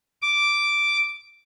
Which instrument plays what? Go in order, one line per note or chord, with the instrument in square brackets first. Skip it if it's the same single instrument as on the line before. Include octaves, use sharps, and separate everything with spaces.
[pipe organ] D6